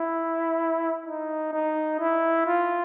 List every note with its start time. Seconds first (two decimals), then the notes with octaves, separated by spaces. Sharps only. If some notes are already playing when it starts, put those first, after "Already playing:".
Already playing: E4
1.06 D#4
1.53 D#4
2.00 E4
2.47 F4